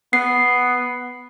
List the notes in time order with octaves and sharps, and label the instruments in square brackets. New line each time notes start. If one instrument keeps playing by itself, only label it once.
[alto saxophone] B3 [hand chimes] C7